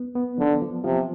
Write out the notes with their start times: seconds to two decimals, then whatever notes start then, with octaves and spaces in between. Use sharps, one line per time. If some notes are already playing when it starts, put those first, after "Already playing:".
Already playing: B3
0.15 B3
0.38 D3 F3
0.62 F3
0.84 C3 F3